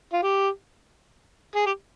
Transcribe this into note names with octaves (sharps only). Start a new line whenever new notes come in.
F4
G4
G#4
G4